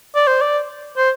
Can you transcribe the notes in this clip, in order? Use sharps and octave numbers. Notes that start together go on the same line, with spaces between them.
D5
C5
D5
C5